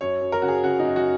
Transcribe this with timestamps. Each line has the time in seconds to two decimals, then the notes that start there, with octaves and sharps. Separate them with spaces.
0.01 F#2 C#5
0.21 F#2
0.32 A#4
0.42 C#3 F#4
0.48 G#4
0.64 C#3 F#4
0.79 D#4
0.85 F#2
0.96 F#4